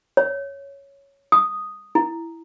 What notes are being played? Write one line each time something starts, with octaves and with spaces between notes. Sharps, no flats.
C#5
D#6
E4